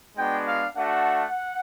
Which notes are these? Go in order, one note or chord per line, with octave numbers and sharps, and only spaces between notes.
G#3 B3 D4 F#4 G5
F5
A3 D4 F#4 F#5